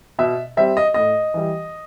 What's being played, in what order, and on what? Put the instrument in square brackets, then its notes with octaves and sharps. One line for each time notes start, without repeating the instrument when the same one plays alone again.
[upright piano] B2 E5
G3 C4 E5
D#5
A2 D#5
E3 G3